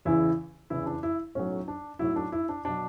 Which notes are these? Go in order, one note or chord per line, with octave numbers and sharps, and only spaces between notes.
E2 C#3 E3 E4
E2 C#3 E3 E4
D4
E4
B1 A2 F#3 C#4
D4
B1 A2 F#3 E4
D4
E4
D4
B2 F#3 D4